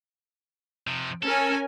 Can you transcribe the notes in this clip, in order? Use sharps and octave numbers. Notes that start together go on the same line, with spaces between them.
C3 F3
C#4 A4 A#4 G#5